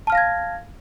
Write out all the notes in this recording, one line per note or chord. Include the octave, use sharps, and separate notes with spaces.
F5 A5 F6 G#6 A#6